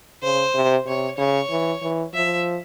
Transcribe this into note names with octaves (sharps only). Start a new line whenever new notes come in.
C#3 C5
C3
C3 C#5
C#3 C#5
E3
E3
F3 E5